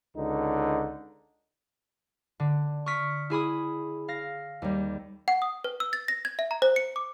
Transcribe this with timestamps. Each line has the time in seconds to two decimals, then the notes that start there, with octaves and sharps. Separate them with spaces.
0.17 C#2 D3 D#4
2.40 D3
2.86 C#6 D#6 F6 B6 D7
3.30 E4 G#4 B5 D#6
4.08 F5 A#6
4.62 D#2 G3
5.28 F#5
5.42 D#6
5.64 B4
5.80 E6
5.93 A6
6.08 A#6
6.25 G#6
6.39 E5
6.51 A#5
6.62 C5
6.76 C#7
6.96 D6